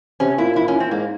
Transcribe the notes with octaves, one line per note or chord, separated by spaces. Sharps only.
C3 C#4
A#2 E4
E4
C#4
C4
G#2 A#3